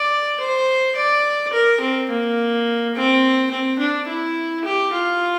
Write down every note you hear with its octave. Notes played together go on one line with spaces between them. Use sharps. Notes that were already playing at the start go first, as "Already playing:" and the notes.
Already playing: D5
C5
D5
A#4
C4
A#3
C4
C4
D4
E4
G4
F4